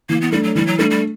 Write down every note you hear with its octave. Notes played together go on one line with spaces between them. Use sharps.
E3 A#3
B3
G3 A3 D4
F#3
E3 G3
F#3
G3 A3 D4
G3